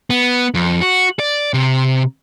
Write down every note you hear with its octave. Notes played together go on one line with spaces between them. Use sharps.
B3
F2
F#4
D5
C3